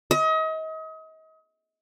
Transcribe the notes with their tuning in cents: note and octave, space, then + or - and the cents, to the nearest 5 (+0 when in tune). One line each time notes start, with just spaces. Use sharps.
D#5 +35